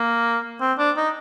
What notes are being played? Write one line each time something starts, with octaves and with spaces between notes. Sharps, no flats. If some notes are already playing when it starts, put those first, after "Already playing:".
Already playing: A#3
C4
D4
D#4